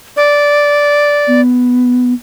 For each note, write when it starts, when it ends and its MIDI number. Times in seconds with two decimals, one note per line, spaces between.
0.17 1.41 74
1.27 2.14 59